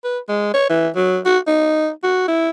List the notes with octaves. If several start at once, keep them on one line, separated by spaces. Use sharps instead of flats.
B4
G#3
C#5
E3
F#3
F#4
D#4
F#4
E4